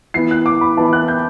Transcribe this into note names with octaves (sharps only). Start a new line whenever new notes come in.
E3 B3 E4 C7
F#6
D6
B5
E3 B3 E4 A5
F#6
G6